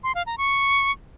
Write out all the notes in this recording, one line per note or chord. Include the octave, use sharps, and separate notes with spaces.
C6
F5
A#5
C#6